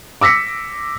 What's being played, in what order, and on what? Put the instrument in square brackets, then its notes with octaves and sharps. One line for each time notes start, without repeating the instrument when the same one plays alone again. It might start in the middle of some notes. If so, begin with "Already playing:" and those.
[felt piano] D6 E6 A#6 B6 C#7